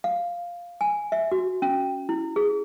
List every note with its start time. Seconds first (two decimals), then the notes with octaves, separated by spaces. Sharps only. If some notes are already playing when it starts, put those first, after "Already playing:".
0.04 F5
0.81 G#5
1.12 E5
1.32 F#4
1.62 C#4
2.09 E4
2.36 G#4